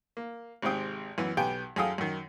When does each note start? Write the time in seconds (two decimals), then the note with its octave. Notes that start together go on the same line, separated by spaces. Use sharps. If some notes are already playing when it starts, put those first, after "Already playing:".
0.17 A#3
0.62 G#1 G#2 C3 C4 G5 D#6
1.18 F#2 E3 B3
1.37 B1 B3 G4 G5 G#5
1.76 F#2 G#4 A4 F5 G5 D#6
1.98 F#2 D#3